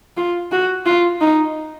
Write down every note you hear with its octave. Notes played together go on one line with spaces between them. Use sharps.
F4
F#4
F4
D#4